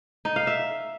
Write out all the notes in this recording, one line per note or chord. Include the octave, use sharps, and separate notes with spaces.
D#4
F5
E5